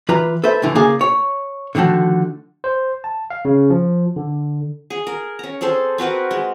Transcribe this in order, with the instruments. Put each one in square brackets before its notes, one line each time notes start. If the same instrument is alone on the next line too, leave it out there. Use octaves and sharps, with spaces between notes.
[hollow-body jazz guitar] E3 F4 B4 A#5
A4 B4 C5 E5
C#2 A2 D3 E3
C#3 A#3 G#4 D5 F5 G#5
C#5
D3 D#3 F3 A3 F#4
[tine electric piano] C5
A5
F5
C#3
F3
D3
[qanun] G#4
A#4
C#4 A#5
C4 G#4 A4 C5
C4 F#4 A#4 B4
G#3